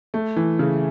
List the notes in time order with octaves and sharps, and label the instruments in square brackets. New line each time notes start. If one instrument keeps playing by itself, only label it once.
[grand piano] A3
E3
C#3